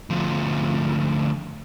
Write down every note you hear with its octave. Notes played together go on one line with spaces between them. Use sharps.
D2 F3